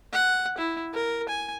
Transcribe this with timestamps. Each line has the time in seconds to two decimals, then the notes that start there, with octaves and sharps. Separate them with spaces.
0.13 F#5
0.58 E4
0.94 A#4
1.29 G#5